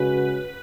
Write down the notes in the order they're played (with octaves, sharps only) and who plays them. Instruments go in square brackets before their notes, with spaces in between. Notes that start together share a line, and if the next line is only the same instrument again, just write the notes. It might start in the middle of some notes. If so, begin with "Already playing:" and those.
Already playing: [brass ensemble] C#3 G#3 C#4 F#4 [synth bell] B4